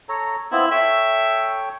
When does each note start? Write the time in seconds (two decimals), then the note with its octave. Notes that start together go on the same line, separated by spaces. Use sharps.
0.09 A4 C#5 A#5
0.52 B3 C4 E4 F4
0.71 A4 C#5 E5 G5